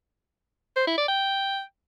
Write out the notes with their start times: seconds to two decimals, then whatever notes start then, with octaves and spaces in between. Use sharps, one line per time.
0.76 C5
0.87 E4
0.98 D5
1.08 G5